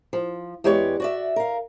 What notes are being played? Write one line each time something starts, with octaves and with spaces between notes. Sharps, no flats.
F3
E2 G#3 G4 B4 C#5 D5
F#4 D5 E5
A#4 F5